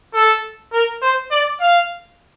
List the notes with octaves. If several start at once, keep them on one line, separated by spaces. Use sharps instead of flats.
A4
A#4
C5
D5
F5